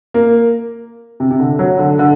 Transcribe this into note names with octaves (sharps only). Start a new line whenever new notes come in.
A#3
C3
C3
D3
F#3
D3
D3